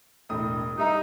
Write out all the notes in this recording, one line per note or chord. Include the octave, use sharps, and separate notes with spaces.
E1 A2 D#6
G3 D#4 E5 A#5